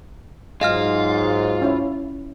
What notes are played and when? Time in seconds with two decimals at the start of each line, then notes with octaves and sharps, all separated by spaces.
0.61 G#2 F#3 F4 G#4 D#5 F5 F6
1.62 C#4 E4